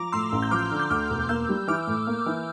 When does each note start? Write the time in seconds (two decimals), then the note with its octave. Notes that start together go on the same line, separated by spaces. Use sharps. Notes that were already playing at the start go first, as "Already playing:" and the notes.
Already playing: F3 A#5 D6
0.12 A2 C6 E6
0.32 A1
0.42 G6
0.51 F3 D6 F6
0.71 D3
0.80 G6
0.90 D2 D6 F6
1.10 E1
1.29 A#3 E6 G6
1.49 G3
1.68 E3 D6 F6
1.87 A2
2.07 A#3
2.26 E3